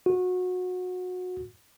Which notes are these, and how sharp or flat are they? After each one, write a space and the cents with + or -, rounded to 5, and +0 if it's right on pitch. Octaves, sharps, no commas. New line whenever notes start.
F#4 -25